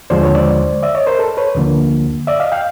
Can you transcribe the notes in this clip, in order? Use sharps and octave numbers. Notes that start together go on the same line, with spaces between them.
D#2 D3 F3 G#3 C5 D5
B4 C#5
C5 D5
D5 E5
C#5 D#5
A#4 C5
A4 B4
B4 C#5
D2 D3 F3 A#3
D5 E5
D#5 F5
F5 G5